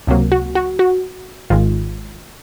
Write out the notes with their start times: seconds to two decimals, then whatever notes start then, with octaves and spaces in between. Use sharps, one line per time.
0.07 C#2 C3 F#3 A#3
0.32 F#4
0.55 F#4
0.79 F#4
1.50 G#1 G#2 D#3 G#3 F4